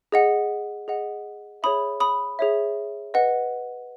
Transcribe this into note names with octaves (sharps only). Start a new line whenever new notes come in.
G#4 D#5 F#5
G#4 D#5 F#5
G#4 C#5 E5 B5 D#6
B5 D#6
G#4 C#5 E5
B4 D#5 F#5